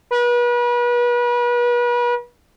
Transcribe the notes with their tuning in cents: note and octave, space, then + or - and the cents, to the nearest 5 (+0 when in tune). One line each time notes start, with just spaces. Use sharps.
B4 -35